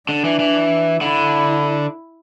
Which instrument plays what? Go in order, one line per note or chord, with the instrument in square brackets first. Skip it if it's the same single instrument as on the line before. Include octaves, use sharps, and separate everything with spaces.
[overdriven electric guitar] D3 [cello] D4
[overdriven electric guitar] E3
E3
[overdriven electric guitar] D3 [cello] E4